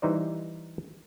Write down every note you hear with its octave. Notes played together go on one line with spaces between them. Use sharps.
E3 G3 D#4 C5 D5